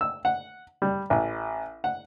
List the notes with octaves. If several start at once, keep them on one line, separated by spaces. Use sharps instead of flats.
E6
F#5
G3
A1
F#5